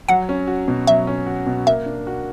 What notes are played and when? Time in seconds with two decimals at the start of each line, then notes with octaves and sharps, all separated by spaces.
0.09 F#3 F#5
0.29 C#4
0.47 F#4
0.68 B2
0.87 F#3 E5
1.07 C#4
1.27 F#4
1.47 B2
1.67 A#3 E5
1.86 D4
2.07 F#4